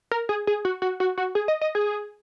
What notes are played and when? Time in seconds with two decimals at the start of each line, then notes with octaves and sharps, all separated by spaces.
0.11 A#4
0.29 G#4
0.47 G#4
0.65 F#4
0.82 F#4
1.00 F#4
1.18 F#4
1.35 G#4
1.48 D#5
1.61 D#5
1.75 G#4